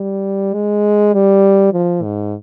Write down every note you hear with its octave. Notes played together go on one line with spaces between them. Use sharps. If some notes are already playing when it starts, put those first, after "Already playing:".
Already playing: G3
G#3
G3
F3
G#2